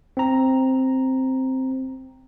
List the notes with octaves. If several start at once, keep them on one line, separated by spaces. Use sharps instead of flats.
C4 A#5